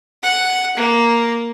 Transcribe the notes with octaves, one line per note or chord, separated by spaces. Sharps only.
F#5
A#3